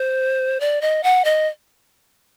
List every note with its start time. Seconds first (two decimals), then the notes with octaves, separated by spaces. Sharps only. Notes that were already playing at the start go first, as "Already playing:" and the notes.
Already playing: C5
0.60 D5
0.81 D#5
1.03 F#5
1.25 D#5